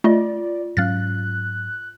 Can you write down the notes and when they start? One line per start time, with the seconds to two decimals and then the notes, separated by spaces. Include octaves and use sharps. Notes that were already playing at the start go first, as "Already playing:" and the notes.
0.04 A3 F4 D5 D#5
0.77 G#2 F#3 C#4 F5 F6 F#6 A6